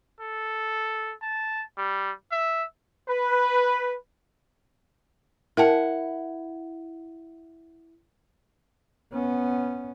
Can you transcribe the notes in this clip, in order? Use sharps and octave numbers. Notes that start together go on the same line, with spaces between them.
A4
A5
G3
E5
B4
E4 A#4 F#5 G5 A5
B3 C#4